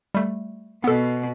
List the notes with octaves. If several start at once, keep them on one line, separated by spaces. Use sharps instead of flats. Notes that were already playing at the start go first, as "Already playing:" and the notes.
G3 A3
B2 B3 A4